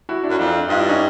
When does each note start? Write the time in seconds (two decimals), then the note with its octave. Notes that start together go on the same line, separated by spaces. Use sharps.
0.09 E4 F#4
0.23 D4 E4
0.29 F#2
0.39 F2 D4 E4
0.68 G2 D#4 F4
0.79 D4 E4
0.89 C#4 D#4